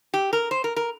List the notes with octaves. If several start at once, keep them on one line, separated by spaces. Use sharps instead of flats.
G4
A#4
C5
A#4
A#4